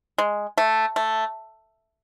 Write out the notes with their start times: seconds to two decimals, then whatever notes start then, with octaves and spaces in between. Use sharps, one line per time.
0.18 G#3
0.58 A3
0.96 A3